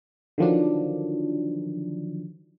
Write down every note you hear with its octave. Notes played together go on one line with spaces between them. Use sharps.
D3 D#3 F3 F#3 D4